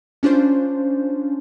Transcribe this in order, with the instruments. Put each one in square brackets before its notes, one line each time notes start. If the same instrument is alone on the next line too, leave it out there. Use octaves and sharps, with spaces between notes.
[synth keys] C#4 D4 F4 C5